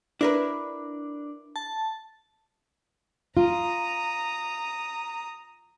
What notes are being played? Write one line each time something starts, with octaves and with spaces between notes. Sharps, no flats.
D4 E4 A#4 B4
A5
F4 A#5 D#6